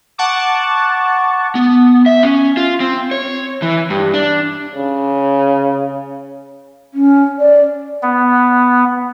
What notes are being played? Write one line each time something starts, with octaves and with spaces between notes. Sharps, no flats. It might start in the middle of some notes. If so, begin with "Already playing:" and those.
F#5 A5 C#6 D6
B3
E5
C#4
F4
C4
C#5
E3
G2
D4
C#3
C#4
D5
B3